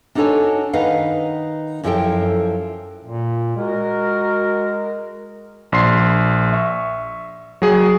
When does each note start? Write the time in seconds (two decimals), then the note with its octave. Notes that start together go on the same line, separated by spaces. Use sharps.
0.15 D4 D#4 F#4 A4 C#5 G#5
0.73 D#3 D#4 B4 F5 F#5
1.83 F#2 F3 E4 G#4 A4 G5
3.04 A#2
3.56 G#3 F#4 A#4
5.72 A#1 C6 C7
6.53 E5 C#6
7.62 F#3 G#4